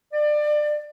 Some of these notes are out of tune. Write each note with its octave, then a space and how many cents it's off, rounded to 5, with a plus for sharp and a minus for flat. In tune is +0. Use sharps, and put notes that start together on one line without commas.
D5 +25